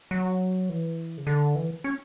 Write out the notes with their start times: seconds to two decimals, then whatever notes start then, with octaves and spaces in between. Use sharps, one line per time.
0.11 F#3
0.69 E3
1.17 C#3
1.27 D3
1.55 E3
1.84 C#4